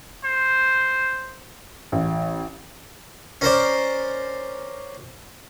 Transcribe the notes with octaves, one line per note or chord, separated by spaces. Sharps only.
C5
A1
C#4 A#4 C5 D5